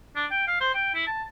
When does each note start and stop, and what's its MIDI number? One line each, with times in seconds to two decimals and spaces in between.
0.16 0.26 62
0.31 0.45 79
0.47 0.58 77
0.60 0.70 72
0.74 0.90 79
0.95 1.06 64
1.07 1.23 81